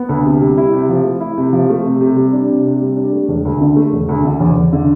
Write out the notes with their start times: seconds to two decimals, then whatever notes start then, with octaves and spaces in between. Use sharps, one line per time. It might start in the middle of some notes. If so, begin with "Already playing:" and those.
Already playing: B3
0.09 D2
0.25 C3
0.41 G3
0.58 E4
0.73 C3
0.89 F3
1.04 A3
1.20 E4
1.38 C3
1.53 F3
1.69 A3
1.85 C3
2.01 C3
2.16 G3
2.33 D4
2.50 C3
2.65 C3
2.81 G3
2.97 D4
3.13 A3
3.28 E1
3.45 D2
3.61 D3
3.76 A3
3.93 E1
4.09 D2
4.24 D3
4.40 E2
4.56 E2
4.73 D3